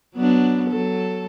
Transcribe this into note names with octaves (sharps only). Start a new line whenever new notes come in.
F#3 B3 D4
F#3 A4